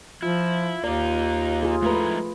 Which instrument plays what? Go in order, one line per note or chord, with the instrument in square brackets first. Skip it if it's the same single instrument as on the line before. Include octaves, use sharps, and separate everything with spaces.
[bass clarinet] F3 [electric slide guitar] E4 [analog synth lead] F4
[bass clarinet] D#2 [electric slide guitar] A#3 D#4 [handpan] D5
[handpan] F4 G#4
[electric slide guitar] G#2 E4 A#5 [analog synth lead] F3 [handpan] A3 B4